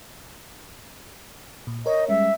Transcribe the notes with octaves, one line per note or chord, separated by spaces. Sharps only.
A#2
A#4 C#5 D#5
G3 G#3 C#4 E5